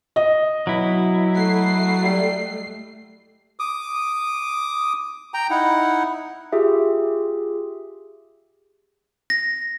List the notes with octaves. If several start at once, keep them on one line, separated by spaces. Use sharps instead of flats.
D#5
B2 F#3 E4
A3 F#4 C7
G3
D6 D#6
G5 A#5
D#4 E4 F#5
F4 G4 G#4 E5
A#6